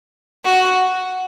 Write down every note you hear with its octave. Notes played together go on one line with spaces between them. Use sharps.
F#4